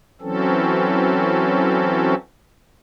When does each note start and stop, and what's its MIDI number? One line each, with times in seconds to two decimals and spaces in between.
0.21 2.15 52
0.21 2.15 54
0.21 2.15 60
0.21 2.15 61
0.21 2.15 69